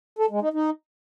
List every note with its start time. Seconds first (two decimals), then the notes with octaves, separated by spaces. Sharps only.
0.19 A4
0.30 G#3
0.42 D#4
0.53 D#4